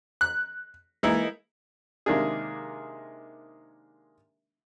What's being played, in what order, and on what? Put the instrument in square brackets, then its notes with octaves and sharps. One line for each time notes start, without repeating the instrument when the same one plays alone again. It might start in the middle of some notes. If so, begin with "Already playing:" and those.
[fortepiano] F#6
[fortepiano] E3 D#4 E4 [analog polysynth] G#3 A#3
[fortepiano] C3 D#3 G#3 A#3 D4 G#4